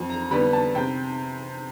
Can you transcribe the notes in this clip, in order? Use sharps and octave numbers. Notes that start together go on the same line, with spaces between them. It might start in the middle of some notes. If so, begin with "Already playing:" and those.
Already playing: F2
A#5
D3 G3 B3 B5
A5
C3 G5